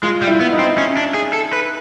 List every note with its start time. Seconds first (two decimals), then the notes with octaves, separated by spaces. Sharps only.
0.03 G#3 F4
0.22 G3
0.27 E4
0.40 B3
0.53 D#4
0.59 C4
0.78 C#4
0.97 D4
1.14 G#4
1.33 A4
1.53 B4